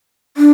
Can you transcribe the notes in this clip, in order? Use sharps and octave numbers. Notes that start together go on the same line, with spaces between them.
D4